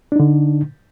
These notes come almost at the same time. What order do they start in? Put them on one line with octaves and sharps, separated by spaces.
D4 D#4 D3